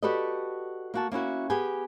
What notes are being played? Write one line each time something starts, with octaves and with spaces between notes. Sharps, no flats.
F#4 G4 A4 B4 D5 D#5
A#3 F#4 A5
A#3 C#4 E4 F#4
B3 G4 G#4 G5 G#5